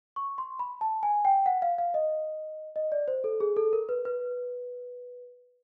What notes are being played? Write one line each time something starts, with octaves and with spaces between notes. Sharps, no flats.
C#6
C6
B5
A5
G#5
G5
F#5
F5
F5
D#5
D#5
D5
C5
A4
G#4
A4
A#4
B4
B4